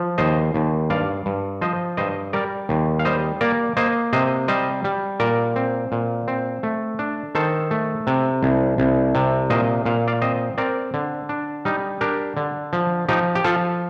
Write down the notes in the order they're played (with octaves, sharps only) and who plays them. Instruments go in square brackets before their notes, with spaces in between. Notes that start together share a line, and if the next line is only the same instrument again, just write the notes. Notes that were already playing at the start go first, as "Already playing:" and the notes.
Already playing: [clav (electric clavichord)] F3
D#2 C5 D#5
D#2
G2 D5 F5
G2
F3 C5 D#5
G2 C5 D#5
G3 A#4 D5
D#2
F5
G3 C5 D#5
A#3 A#4 D5
A#3 C5 D#5
C3 C5 D#5
G3 C5 D#5
G3
A#2 A#4 D5
C4
A#2
C4
A3
D4
D#3 A4 C5
A3
C3
C2
C2
C3
A#2 C5 D#5
A#2 F5
D5 F5
C4 C5 D#5
C4 A#4 D5
D3
D4
G3 D#4
D4 G4 A#4
D3
F3
F3 D#4 G4
G4
F3 F4 A4